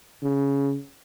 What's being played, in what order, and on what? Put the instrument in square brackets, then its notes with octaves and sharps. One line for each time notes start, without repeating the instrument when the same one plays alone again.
[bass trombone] C#3